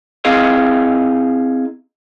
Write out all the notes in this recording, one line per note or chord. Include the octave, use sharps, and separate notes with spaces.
C4 E4 G#4 D#5 F5